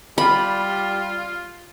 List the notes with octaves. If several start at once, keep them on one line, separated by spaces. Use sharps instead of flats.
G3 F4 B5